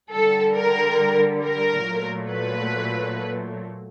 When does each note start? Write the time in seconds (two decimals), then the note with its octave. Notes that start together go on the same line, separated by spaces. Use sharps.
0.11 D3 G3 A4
0.56 A#4
1.44 A#4
1.87 A#2 F#3 A3
2.31 B4